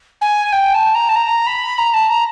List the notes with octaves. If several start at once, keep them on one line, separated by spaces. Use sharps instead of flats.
G#5
G5
A5
A#5
A5
A#5
B5
A#5
A5
A#5